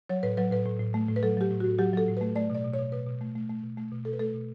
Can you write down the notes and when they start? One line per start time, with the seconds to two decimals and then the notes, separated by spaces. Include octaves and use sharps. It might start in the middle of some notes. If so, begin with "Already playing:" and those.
0.09 F#3 C#5
0.23 A2 B4
0.37 F#3 B4
0.52 A2 B4
0.66 A2
0.80 A2
0.94 A3
1.08 A2
1.16 B4
1.23 F#3 A4
1.37 F#3 G4
1.51 A2
1.60 F#4
1.64 A2
1.78 F#3 G4
1.93 F#3 A4
2.08 A2
2.17 B4
2.21 A3
2.36 A3 D5
2.50 B2 D5
2.64 B2
2.74 C#5
2.79 B2
2.92 B2 B4
3.07 B2
3.21 A3
3.35 A3
3.49 A3
3.63 B2
3.77 A3
3.92 B2
4.05 B2 A4
4.13 B4
4.19 A3 A4
4.34 B2